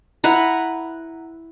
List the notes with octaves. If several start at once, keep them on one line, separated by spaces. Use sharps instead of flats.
E4 B4 F#5 A#5